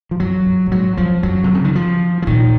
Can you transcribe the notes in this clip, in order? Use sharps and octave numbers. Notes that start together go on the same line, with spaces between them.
F3
F#2 F#3
F#2
A#2
G#2 F#3
F2 F3
F#2 F#3
C3
C#3
D#3
F3
F3
A#2 D#3